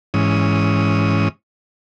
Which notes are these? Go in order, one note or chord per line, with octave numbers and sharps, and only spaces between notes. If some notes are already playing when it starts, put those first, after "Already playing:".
G#2 E3 C#4 D#6